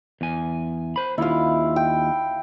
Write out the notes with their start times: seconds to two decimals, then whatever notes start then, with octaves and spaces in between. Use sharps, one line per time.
0.21 E2 G#5
0.96 C5 B5
1.18 D#2 E4 F4 F5
1.76 G5